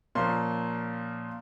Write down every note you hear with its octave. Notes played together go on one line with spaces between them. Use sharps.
A#2 F3 A#3 C#4 C6